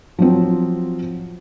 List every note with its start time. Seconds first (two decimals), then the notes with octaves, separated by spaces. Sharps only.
0.19 F3 F#3 C4